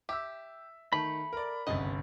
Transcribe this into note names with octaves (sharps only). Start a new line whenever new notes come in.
G4 E5 E6
D#3 A3 B5
A#4 D5
G1 C2 C#3 B3 D#5